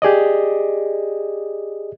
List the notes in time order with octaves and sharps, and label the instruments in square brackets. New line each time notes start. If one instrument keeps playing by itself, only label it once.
[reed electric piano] G4 G#4 D5 D#5